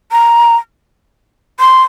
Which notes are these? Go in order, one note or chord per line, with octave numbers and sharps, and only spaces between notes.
A#5
C6